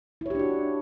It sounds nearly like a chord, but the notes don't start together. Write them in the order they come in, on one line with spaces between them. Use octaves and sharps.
E4 C#5 G4 D4 F#4